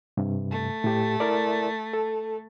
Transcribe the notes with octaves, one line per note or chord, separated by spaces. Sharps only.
G2 C3
A3
A2 G4
E4 A#4 D5
A4